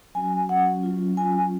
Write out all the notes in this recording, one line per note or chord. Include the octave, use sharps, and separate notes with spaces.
F#3 C#4 F#4 G#5
F#3 C#4 F#4 F#5
F#3 C#4 F4
F#3 C#4 F4 G#5